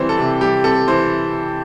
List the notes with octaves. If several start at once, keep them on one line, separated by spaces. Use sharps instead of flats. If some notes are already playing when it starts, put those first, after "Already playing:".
Already playing: E3 G3 C4 C5
A4
C3
G3 G4
C4 A4
E3 C5